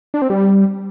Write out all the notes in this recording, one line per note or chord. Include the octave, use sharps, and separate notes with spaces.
D4
C4
G3